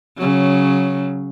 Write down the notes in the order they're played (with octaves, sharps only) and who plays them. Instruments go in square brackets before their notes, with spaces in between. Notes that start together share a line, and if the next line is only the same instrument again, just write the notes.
[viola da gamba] C#3 F#3